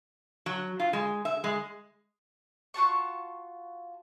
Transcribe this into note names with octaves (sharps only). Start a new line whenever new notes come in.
F#3
F4
G#3
E5
G#3
F4 F#4 A5 C#6